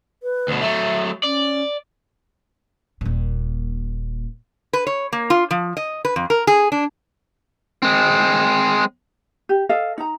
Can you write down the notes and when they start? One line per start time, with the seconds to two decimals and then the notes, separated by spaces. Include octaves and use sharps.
0.23 B4
0.48 D2 B2
0.62 F#3 A3 E5
1.23 C#4 D5
3.01 D#1 A#2
4.73 B4
4.87 C#5
5.13 A#3
5.30 F4
5.51 F3
5.77 D#5
6.05 B4
6.16 F2
6.30 A#4
6.47 G#4
6.72 D4
7.83 G#3 C4
9.49 G4
9.69 A4 D#5 F5
9.98 D#4 A#5